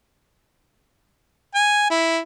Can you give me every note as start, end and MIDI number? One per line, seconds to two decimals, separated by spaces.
1.55 1.89 80
1.90 2.19 64